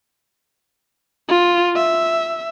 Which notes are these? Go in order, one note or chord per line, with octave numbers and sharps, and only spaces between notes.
F4
E5